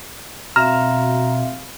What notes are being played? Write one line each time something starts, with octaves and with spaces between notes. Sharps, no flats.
B2 C4 E5 F5 A#5 F6